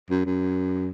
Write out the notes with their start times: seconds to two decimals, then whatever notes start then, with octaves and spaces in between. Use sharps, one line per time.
0.10 F#2
0.25 F#2